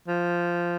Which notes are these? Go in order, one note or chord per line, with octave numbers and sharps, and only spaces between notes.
F3